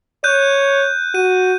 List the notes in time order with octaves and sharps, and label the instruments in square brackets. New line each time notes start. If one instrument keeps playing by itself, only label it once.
[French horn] C#5 [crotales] F#6 G6 D#7
[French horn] F#4 [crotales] D#7